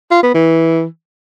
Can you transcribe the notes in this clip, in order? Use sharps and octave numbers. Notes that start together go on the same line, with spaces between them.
F4
B3
E3